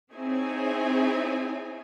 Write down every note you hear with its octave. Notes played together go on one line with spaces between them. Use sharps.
C4 D#4 E4 G#4 C#5 G#5